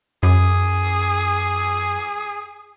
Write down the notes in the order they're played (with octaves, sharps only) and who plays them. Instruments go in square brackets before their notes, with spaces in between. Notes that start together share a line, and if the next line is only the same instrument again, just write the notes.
[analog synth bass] F#2 [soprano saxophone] G#4